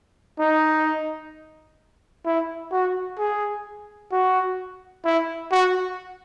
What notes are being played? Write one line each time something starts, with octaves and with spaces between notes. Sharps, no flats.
D#4
E4
F#4
G#4
F#4
E4
F#4